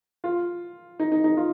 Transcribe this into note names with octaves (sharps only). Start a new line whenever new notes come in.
F4
D#4
D#4
D#4
F4